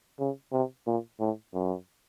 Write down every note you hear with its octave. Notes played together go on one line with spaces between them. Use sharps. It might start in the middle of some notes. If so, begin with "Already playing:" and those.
C#3
C3
A#2
A2
F#2